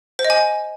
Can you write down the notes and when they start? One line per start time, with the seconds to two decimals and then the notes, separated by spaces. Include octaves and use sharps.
0.19 C5
0.24 D#5
0.30 G#5